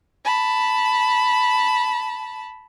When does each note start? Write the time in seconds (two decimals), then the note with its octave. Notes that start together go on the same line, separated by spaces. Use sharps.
0.25 A5 B5